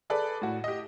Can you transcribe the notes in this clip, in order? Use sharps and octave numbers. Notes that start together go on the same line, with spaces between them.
G#4 A4 B4 D5
A2 F#4
G4 D#5